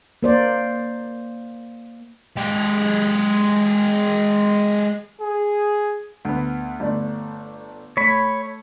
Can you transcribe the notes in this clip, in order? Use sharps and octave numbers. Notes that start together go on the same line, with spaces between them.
A#3 C5 D5
G#3 G4
G#4
D2 B3
G1 A3 D5
A3 C#5 B5